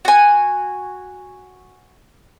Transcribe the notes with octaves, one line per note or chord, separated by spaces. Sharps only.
F#4 G#5